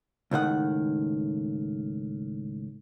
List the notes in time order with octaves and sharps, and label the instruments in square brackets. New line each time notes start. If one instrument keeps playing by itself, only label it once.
[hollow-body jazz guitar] C#2 A2 D#3 F#5